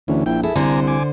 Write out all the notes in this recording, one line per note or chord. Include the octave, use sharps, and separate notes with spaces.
D2 D3 E3 C#4
A#1 E4 G5
E4 G#4 A4
C2 D3 C5 D5 G#5 A#5
G#5 D6